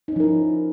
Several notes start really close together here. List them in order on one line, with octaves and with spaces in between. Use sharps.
D#4 C#4 F3 A#4 E4